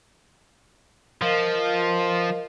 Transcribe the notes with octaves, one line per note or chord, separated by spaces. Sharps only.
F3 A#4 D#5 F5